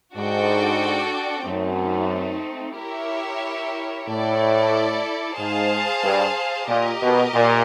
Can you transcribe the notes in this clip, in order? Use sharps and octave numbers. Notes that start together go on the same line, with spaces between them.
G#2 D4 F#4 A4 D5 G5
F#2 A3 C4 D#4
E4 G4 A#4 C#5 E5
A2 E4 A4 D5
G#2 G#4 C5 F5 A5
G2
A#2 G4 A#4 D#5
B2
A#2